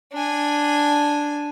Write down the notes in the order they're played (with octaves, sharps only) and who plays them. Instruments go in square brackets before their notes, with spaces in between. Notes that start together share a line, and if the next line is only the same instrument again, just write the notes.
[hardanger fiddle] D4 G#5